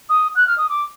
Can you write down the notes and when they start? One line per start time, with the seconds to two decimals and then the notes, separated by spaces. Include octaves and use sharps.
0.09 D#6
0.36 F#6
0.47 F6
0.58 D#6
0.69 D6